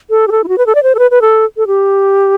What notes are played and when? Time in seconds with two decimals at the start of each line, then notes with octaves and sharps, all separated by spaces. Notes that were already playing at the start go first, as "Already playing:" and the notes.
0.10 A4
0.28 G4
0.32 A4
0.44 E4
0.48 F#4
0.58 B4
0.66 A4
0.75 D5
0.83 C5
0.95 A4
0.99 B4
1.11 B4
1.21 A4
1.57 A4
1.67 G4